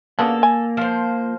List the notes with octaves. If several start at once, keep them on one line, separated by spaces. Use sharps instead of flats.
C#3 A#3 B3 D4 A4
G#5
F3 C5